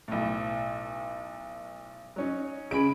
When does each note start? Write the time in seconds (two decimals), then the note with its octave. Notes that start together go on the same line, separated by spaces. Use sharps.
0.08 B1 A2
2.16 F#3 C#4 D#4
2.71 C#3 G#3 G#5 B5 D7